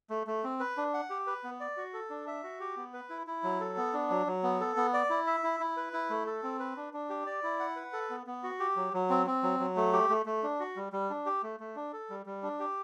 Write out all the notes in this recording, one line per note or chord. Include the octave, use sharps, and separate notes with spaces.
A3
A3
C4
B4
D4
F#5
G4
B4
B3
D5
F#4
A4
D4
E5
F#4
G4
B3
B4
E4
E4
F#3
A4
B3
D4
F#3
F#3
B3
A4
B3
D5
E4
E5
E4
E4
B4
E4
A3
A4
C4
B4
D4
D4
G4
D5
E4
F#5
B4
A4
B3
B3
F#4
G4
F#3
F#3
C4
C4
F#3
F#3
A3
G4
A3
A3
D4
F#4
G3
G3
D4
G4
A3
A3
D4
A4
G3
G3
D4
G4